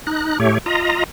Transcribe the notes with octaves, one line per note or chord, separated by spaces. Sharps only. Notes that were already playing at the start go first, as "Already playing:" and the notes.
D#4 F#6
A2 A3 G4 C#5
F4 D#5 A#5